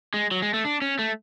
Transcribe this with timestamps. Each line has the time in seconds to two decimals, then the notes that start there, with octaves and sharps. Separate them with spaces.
0.14 G#3
0.31 F#3
0.42 G#3
0.54 A3
0.65 D4
0.82 C#4
0.99 A3